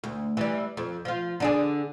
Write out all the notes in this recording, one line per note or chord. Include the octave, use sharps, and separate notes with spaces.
D2
E3 G3
F2
F3 F4
D3 D4 G#4